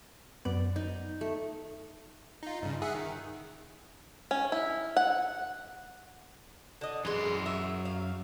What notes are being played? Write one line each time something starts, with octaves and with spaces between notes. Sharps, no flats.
F#2 B3 D5
D#4
A3
D#4 F4
G2 C#3
G#4 E5 F#5
D#3
C#4
E4
F#5
D3 D#5
F#2 E3 G#3 C6
E5
F5